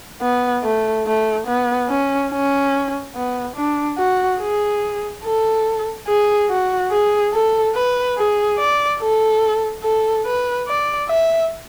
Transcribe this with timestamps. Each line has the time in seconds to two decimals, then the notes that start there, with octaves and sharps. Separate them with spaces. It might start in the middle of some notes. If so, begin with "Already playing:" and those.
0.22 B3
0.63 A3
1.06 A3
1.47 B3
1.89 C#4
2.32 C#4
3.15 B3
3.56 D4
3.98 F#4
4.41 G#4
5.24 A4
6.07 G#4
6.49 F#4
6.91 G#4
7.33 A4
7.75 B4
8.17 G#4
8.59 D5
9.00 A4
9.83 A4
10.26 B4
10.67 D5
11.09 E5